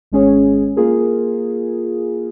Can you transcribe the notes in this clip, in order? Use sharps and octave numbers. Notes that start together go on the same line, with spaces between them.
G#1 G#3 C#4 G#4 C#5
A#3 F4 G#4 A#4